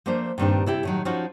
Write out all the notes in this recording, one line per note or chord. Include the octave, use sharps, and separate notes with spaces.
F3 A3 A#3 D4 C5
G2 A#2 D#3 C4 D4 G4
C3 E4 G4
A2 D#3 F#3
F3 C#4 D#4 F4 F#4